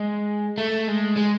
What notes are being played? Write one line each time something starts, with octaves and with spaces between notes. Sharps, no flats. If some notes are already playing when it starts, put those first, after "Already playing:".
Already playing: G#3
A3
G#3
G#3